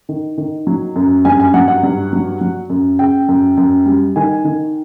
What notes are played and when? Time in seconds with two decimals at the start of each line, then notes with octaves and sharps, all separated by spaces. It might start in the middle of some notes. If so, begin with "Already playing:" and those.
0.09 D#3
0.38 D#3
0.67 F#3
0.96 F#2
1.25 G2 G#5
1.40 G#5
1.54 F#3 F#5
1.68 F#5
1.83 G2
2.13 F#3
2.41 F#3
2.70 F#2
2.99 C#3 G5
3.29 F#2
3.58 F#2
3.86 G3
4.16 D#3 G#5
4.45 D#3